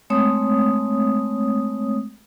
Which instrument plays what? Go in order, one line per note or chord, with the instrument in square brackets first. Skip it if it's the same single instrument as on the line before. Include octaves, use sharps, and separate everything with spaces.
[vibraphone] G#3 A3 C4 C#5 D#6